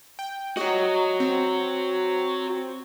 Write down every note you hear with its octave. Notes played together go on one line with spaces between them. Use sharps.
G5
F#4 C#5 D#5
C4